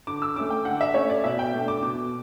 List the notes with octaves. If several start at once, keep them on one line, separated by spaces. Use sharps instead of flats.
D3 D6
E6
A3 C#4 D6
G5
D3 F#5
E5
A3 C#4 C#5
D5
B2 E5
G5
A3 D4
D6
B2 D6